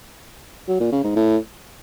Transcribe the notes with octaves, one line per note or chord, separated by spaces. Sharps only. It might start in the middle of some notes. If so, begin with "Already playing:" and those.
F#3
A#2
C#3
G#2
A2